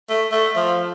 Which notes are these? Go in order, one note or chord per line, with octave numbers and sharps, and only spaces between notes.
A3
A3
F3